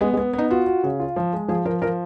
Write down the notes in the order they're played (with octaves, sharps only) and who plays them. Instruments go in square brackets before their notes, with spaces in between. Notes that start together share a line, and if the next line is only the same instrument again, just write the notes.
[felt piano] G#3 [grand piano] B3
[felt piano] G#3
[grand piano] B3
[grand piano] B3 [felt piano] D#4
[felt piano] F4 [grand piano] F#4
[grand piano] F#4
C#3
F4
F3
G#3
[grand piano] F3 [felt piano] G#4
[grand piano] F3 [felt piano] A#4
[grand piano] F3 [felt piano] A#4